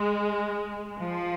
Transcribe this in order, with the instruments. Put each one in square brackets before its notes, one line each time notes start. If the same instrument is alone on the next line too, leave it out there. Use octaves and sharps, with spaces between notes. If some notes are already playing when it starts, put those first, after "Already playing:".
Already playing: [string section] G#3
F3